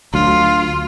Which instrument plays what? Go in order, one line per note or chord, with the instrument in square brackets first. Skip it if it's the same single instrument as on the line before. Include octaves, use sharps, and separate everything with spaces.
[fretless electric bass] D2 F#3 [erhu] F4